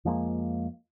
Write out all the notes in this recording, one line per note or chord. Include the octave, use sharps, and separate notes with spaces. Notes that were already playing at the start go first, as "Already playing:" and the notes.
F2 F3 G#3 A#3